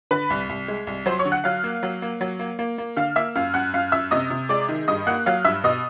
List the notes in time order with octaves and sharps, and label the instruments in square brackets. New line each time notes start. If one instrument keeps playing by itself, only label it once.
[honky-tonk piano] D3 B4 B5
C2
C2
G#3
C2
F#3 C5 C6
C#5 C#6
D3
F#5 F#6
F#3 F5 F6
A#3
F#3
A#3
F#3
A#3
A#3
A#3
D3 F5 F6
A#3 E5 E6
F#2 F5 F6
F#2 F#5 F#6
F#2 F5 F6
F#2 E5 E6
C3 D#5 D#6
C3
G#3 D5 D6
D#3
G2 D#5 D#6
A#3 F#5 F#6
F#3 F5 F6
G2 E5 E6
B2 D#5 D#6